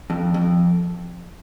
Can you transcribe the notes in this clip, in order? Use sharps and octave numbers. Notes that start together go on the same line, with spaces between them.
F2
F2